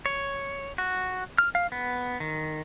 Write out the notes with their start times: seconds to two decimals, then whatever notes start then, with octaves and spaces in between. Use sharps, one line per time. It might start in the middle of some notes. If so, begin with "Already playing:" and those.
0.06 C#5
0.78 F#4
1.38 F6
1.55 F5
1.72 B3
2.20 D#3